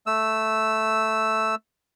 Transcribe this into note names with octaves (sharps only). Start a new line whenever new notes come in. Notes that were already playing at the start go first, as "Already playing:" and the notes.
A3 E6